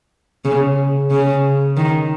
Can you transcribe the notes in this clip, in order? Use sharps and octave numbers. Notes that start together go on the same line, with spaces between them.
C#3
C#3
D#3